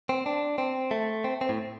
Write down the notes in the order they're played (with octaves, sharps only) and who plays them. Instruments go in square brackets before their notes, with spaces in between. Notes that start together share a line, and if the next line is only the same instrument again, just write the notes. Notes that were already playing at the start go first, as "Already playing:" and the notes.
[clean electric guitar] C4
D4
C4
A3
C4
C4
A2